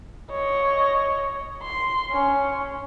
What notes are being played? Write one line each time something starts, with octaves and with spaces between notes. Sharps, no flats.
C#5 D#5
C6
C#4